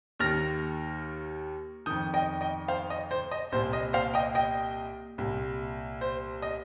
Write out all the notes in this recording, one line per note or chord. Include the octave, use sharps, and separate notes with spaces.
D#2 D#3 F6 A#6
F2 D#3 D#6 G6
D#5 G5
D#5 G5
C5 F5
D#5
C5
D#5
C2 A#2 C5
D#5
C5 F5
D#5 G5
D#5 G5
C2 A#2
C5
D#5